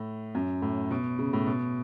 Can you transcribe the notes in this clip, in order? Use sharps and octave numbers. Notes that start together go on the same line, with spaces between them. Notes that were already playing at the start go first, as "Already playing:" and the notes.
Already playing: A2
F#2
A2
B2
C#3
A2
B2